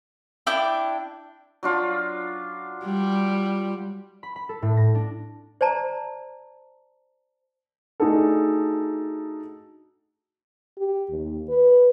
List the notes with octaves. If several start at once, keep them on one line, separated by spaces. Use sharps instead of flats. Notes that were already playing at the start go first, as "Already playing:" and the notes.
D4 E4 G5 D6
F#3 D4 F4
G3
B5
B5
A4
A2
A#6
D4
C5 D5 A5 A#5
A3 D4 D#4 F#4 G#4 A4
G4
D#2
B4